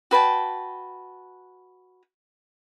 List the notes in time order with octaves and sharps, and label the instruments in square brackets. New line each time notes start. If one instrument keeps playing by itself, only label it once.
[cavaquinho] F#4 B4 G5 A5